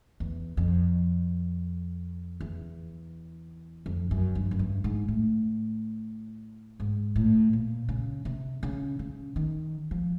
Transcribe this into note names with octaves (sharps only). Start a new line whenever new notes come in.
E2
F2
E2
F2
F#2
G2
F#2
G2
G#2
A2
G#2
A2
A#2
C#3
C3
C#3
C#3
D#3
F3